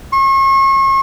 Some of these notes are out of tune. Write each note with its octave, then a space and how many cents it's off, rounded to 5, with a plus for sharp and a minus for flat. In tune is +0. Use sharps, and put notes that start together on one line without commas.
C#6 -40